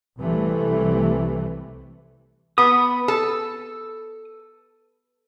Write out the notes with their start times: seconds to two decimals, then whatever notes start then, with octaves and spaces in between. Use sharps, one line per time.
0.19 C2 C3 E3 G3 A3
2.58 B3 D#6
3.08 A4